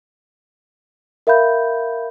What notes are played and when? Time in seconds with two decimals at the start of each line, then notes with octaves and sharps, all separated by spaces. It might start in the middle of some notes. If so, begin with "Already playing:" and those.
1.27 A#4 E5 F5 B5 G6